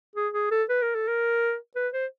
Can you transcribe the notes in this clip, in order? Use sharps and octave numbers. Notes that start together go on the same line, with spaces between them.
G#4
G#4
A4
B4
A#4
A4
A#4
B4
C5